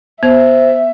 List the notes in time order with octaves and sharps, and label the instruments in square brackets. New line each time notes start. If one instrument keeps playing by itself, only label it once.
[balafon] B3 [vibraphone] C5 [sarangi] E5